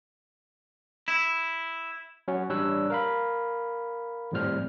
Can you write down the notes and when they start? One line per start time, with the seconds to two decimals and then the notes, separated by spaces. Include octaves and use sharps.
1.08 E4
2.28 F#3 C#4 F#4
2.49 A1 G3 D4 C#5 E6 F#6
2.90 A#4 F5 B5
4.32 G#1 F2 A2 G3 C5 F6